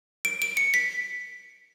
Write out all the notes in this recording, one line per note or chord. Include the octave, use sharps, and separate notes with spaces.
D7
D7
C#7
B6